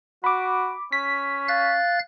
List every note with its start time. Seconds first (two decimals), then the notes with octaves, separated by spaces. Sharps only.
0.24 F#4 B5 D6
0.92 C#4 B6
1.48 F5 F#6 A6